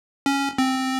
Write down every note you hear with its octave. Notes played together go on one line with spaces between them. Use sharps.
C#4
C4